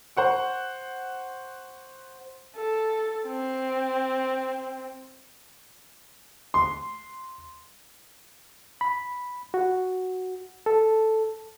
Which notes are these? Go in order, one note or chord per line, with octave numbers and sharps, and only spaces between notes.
C5 F#5 C#6
A4
C4
C6
B5
F#4
A4